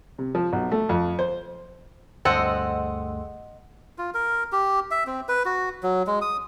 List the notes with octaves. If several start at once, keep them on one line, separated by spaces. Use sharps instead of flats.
C3
F3
B1
A3
F2
C5
D2 G2 G#3 A3 C4 A4 D#5 F#5
F4
A#4
G4
E5
C4
B4
F#4
F#3
G#3
D#6